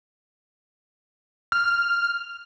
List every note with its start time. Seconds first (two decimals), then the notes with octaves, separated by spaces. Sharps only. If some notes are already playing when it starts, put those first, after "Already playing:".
1.52 F6